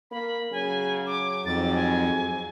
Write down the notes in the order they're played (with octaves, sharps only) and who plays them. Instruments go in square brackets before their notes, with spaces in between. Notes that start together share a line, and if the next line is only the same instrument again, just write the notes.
[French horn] A#3 [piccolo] B5
[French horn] C#3 [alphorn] F#3 [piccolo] G#5
[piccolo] D6
[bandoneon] F2 [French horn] G#2 [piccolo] A6
[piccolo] G#5
[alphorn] G#4